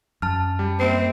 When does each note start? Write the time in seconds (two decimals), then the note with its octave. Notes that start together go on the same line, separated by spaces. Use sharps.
0.22 F#2 A5 F6
0.59 G3
0.80 A#3 C4 C7